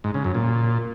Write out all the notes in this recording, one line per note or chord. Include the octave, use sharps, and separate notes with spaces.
G#2
C#3
F#2
A#2